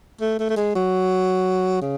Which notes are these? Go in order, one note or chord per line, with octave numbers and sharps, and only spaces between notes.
A3
A3
A3
G#3
F#3
C#3